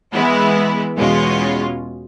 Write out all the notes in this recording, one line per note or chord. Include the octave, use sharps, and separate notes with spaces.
E3 G#3 B3 E4
E2 B2 G#3 C#4 F4